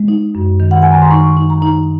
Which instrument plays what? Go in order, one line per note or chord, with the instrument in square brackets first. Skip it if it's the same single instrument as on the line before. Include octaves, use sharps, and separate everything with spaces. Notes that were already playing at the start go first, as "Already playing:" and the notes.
Already playing: [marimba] G#3
D#4
F#2
D#3
F#5
D#3 G#5
A#5
C6
D#4 C#6
D#4
A#5
D#4